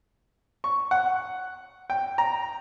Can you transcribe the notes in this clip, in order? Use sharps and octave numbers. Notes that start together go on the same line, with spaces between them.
C#6
F#5
G5
A#5